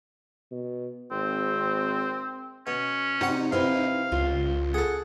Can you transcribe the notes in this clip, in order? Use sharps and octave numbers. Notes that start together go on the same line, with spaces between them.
B2
G#1 C4
B2 C#4
C3 G3 D#4 F#4 F#5
C3 C4 E4 B4 F5
C#2 F4
G#4 A4 F#5